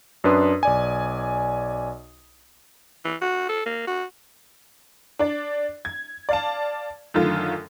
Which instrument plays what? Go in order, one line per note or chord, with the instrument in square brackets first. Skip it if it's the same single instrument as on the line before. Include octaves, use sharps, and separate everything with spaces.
[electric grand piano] F#2 D4 B4 C6 D#6
B1 D5 G#5
[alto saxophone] E3
F#4
A4
A#3
F#4
[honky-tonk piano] D4 D5
G#6
D5 F5 A5
F#2 D3 D#3 A3 F4